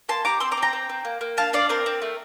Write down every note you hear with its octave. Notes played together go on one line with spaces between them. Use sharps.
A#3 A5 C6
G4 A#5 D6
C4 C6 E6
A#5 D6
C4
G5 A#5
C4
C4
A#3
A#3
D4 F5 A5
D4 D5 F5
C4 A#4
C4
A3